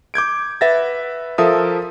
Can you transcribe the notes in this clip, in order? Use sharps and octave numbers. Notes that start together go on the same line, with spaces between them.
D6 G6 G#6 D7
B4 E5 F#5 A6 A#6
F3 A4 A#4 E5 F5 D#6